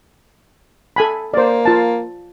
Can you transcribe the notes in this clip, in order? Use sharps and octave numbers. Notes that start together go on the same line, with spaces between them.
A4 G#5 B5
A#3 C5 D5
F4 A5